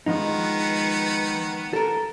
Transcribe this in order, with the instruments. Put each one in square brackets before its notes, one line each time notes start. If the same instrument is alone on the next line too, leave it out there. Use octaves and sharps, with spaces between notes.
[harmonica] D#3 B3 [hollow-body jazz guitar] F3 G#3 D#4
[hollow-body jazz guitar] A4 A#4